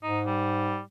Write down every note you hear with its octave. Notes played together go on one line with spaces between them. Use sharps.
G#2 D#4
G3